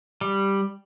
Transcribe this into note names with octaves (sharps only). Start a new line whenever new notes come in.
G3